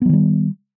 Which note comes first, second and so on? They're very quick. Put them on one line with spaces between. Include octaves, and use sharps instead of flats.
B3 F#3 D#3 G3